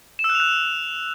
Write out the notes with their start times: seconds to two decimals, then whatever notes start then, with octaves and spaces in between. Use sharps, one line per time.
0.19 E7
0.24 E6
0.29 F#6
0.35 F7
0.40 F#6